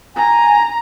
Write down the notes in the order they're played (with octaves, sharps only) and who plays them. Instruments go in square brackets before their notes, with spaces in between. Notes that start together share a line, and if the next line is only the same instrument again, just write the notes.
[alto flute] G#5 [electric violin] A#5